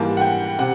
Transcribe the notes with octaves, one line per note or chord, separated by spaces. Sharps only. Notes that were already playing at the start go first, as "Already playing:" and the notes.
Already playing: G#2 E3 G3 A#3 A5
F#5
G5
C3 F#5